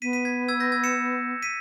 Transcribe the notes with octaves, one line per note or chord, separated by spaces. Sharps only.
B3 B6 D#7
B6 D#7
G#6 B6
E6 G#6
G6 A#6
E6 G#6
C#7 E7
B6 D#7